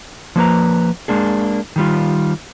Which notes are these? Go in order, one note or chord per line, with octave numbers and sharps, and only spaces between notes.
F3 A#3 B4 A#5
G#3 A#3 D4 G#4
D#3 G3 F4